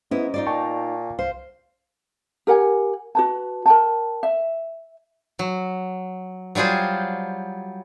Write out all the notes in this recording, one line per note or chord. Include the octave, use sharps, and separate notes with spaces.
G#2 B3 C#4 E4
D#4 F4 D5
A#2 G5 A5 C#6
C2 C5 F5
G4 A#4 F#5 G#5
F#4 B4 A5
A#4 G5 A5
E5
F#3
F#3 G3 F4 G#4 C5